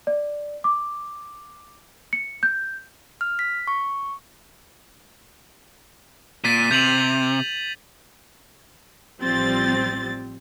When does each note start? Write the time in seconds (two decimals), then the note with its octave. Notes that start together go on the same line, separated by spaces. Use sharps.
0.07 D5
0.64 D6
2.13 C#7
2.43 G6
3.21 F6
3.39 B6
3.67 C#6
6.44 A#2 A6 B6 D#7
6.71 C3 G6 F7 F#7
9.22 A1 F3 G3 C4 A6